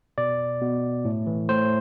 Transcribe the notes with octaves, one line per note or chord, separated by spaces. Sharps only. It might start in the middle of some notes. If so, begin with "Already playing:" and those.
B2 D5
B2
A2
E3
A2 C5